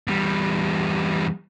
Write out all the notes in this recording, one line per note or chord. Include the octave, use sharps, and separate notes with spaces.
E2 G3